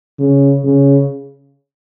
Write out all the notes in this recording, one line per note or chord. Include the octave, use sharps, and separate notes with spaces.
C#3
C#3